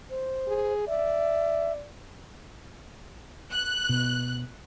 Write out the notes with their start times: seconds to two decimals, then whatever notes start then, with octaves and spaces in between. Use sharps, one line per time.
0.10 C5
0.48 G#4
0.88 D5 E5
3.51 F#6
3.89 B2